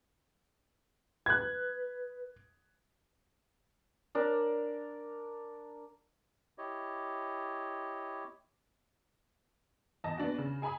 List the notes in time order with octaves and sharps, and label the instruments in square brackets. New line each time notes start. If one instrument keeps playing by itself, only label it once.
[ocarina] B4 [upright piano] F#6 G#6
[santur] D4 A#4 D5
[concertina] E4 G4 C#5 D#5
[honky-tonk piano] E2 D#5 A5 A#6
B3 D4 F#4
C#3
G#4 G#5 A#5 B5 D#6